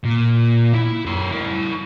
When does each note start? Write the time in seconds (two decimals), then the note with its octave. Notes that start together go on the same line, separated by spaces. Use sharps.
0.04 A#2
0.75 E4
1.06 F#2 C6
1.31 E4 A#4